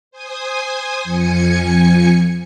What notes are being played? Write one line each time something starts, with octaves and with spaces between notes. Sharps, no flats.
C5 G#5 D#6
F2 F3 G#5 G#6 C#7